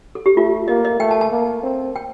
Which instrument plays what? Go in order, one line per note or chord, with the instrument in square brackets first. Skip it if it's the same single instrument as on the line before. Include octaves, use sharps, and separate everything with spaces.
[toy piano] A4
G4
[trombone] A3 [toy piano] F4
[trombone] A#3 [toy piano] D#5
[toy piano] D#5
[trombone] A3 [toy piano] G5
[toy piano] A5
A5
[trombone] A#3
C4
[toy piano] G5